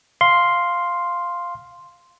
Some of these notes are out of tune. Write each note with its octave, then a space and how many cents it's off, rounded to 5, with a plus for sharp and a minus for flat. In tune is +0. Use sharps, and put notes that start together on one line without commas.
F5 +0 C6 +0